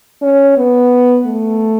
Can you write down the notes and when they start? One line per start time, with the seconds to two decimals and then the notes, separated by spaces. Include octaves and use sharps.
0.22 C#4
0.57 B3
1.26 A3